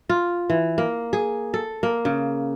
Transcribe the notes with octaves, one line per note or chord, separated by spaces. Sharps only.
F4
E3
A#3
G#4
A4
A#3
C#3